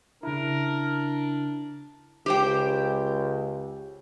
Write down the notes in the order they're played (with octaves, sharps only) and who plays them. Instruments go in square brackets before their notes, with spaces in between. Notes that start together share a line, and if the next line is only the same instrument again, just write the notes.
[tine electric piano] C#3 E4 [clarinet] D4 [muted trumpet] A#4
[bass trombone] C#2 [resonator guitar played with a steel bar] G4 C5 G5